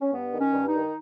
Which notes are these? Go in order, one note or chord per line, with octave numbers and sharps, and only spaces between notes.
C#4
G2 B3
D#3
C#4
G2
D#4
D#3